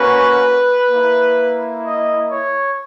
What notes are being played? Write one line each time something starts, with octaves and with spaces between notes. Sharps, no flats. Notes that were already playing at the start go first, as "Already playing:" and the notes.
Already playing: A#3 C#4 F#4 B4
A#3 E4
D#5
C#5